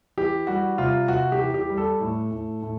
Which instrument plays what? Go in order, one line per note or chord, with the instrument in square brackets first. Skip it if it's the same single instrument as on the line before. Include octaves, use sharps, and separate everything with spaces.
[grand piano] E3 G4
G3 F#4
C3 F4
C3 F#4
G4
E3
G4
G3
A4
A2
A2
A2